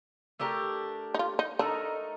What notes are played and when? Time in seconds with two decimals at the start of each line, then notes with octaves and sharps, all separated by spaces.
0.39 A3 D4 G4 A#4
1.14 D#4
1.19 F4
1.39 D#4
1.59 A3 D4 D#4 A#4